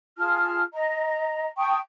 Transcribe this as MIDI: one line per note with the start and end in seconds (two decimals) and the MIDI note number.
0.17 0.62 65
0.17 0.62 68
0.17 0.62 81
0.17 0.62 89
0.73 1.47 75
0.73 1.47 82
1.58 1.77 79
1.58 1.77 81
1.58 1.77 85
1.58 1.77 87